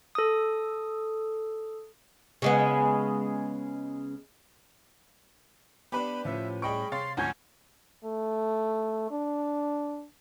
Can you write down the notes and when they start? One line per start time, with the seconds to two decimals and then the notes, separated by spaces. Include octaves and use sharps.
0.15 A4 D#6
2.42 C#3 G#3 B3
5.92 B3 D4 G4 B4 B5
6.25 A2 F3 C#4 E5
6.62 G3 G#4 D#5 G5 B5 C#6 D7
6.92 C3 C#5 F5 C6 A6
7.17 D2 G#2 F3 C#4 F#5 G#5 G6
8.05 A3
9.11 D4